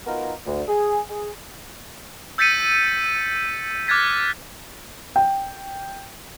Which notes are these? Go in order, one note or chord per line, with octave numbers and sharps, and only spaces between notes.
B3 D#4 F4 F#4 A#4
D2
G#4
G#4
E6 G6 A6 B6 C#7 D#7
D6 F6 F#6 G#6 A6 B6
G5